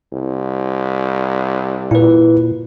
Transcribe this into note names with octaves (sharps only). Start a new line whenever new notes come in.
C2
A#2 E4 B4